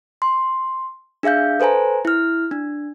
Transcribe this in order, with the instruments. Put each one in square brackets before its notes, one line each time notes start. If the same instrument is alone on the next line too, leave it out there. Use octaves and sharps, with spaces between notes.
[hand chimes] C6
D4 G#4 E5 F5 G6
A4 B4 C5 G#5 A#5
E4 F6
D4